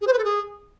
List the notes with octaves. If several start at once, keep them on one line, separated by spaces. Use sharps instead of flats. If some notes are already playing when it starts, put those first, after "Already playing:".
G#4
C5
B4
A4
G#4